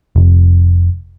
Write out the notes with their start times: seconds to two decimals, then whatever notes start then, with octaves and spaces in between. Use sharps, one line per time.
0.16 F1